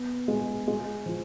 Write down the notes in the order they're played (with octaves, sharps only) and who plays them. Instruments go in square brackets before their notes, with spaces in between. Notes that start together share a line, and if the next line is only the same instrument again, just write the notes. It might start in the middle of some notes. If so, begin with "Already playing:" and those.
Already playing: [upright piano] B3
G#3
G#3
F3